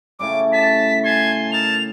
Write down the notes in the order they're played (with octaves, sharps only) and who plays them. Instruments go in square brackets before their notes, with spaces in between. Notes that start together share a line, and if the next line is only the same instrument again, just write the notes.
[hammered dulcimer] A2 C#3 G3 [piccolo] D6
[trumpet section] A5 [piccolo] B6
[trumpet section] G#5 A5 C6 [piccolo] G#6
[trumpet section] D#4 A#4 A5 [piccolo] F7